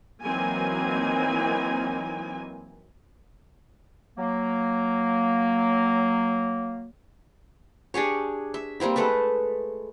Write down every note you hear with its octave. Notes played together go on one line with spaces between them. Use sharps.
E3 F#3 A#3 C4 D#4 G#5
F#3 A#3
D4 G4 G#4 C#5
E5
G3 A#3 C4 E4
G#3 A3 A4 B4